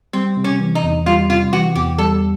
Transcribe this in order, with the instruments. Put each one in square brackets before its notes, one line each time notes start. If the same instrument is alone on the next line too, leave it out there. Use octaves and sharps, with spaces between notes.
[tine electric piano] G3 [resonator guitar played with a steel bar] C4
[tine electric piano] C3
[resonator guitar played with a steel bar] C#4
[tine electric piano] E3
[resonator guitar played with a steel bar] D#4
[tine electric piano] E2
[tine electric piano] G3 [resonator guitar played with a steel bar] F4
[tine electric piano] C3 [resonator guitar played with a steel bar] F4
[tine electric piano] E3 [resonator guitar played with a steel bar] F#4
[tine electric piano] E2 [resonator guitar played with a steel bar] G4
[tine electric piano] G3 [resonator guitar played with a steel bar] A4